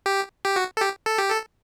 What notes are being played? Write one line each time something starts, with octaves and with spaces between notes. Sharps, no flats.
G4
G4
F#4
A4
G4
A4
G4
A4